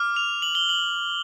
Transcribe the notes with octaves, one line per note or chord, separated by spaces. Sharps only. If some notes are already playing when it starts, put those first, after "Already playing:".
Already playing: D6 F6
F7
F#7
G7
F#7